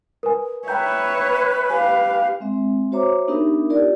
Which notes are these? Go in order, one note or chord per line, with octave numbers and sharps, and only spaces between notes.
A#4 B4 G#5
B4 C#5 E5 G5 A#5 G6
G4 F5 G#5
G#3 C4 E5
F#4 C5 C#5 E5 A#5 D6
B3 D4 D#4 G4 A#4 E5
F4 G4 A#4 D5